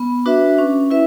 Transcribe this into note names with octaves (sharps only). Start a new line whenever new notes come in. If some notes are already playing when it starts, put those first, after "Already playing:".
Already playing: B3
D4 F#4 B4 E5
C#4
E4 B4 E5